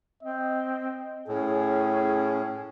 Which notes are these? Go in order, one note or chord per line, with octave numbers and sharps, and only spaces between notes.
C4 D#5
A2 C#4 G#4